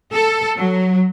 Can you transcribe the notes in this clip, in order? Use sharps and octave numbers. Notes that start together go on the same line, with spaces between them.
A4
F#3